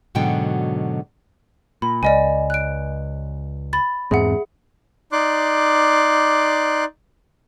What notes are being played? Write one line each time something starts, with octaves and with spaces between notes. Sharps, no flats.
G#2 B2 D3 F#3 G5
A#2 B5
C#2 D5 D#5 G#5
F#6 D7
B5 A6
E2 G#2 C4 G#4 E5 F#5
D#4 D5 C6 D6 F#6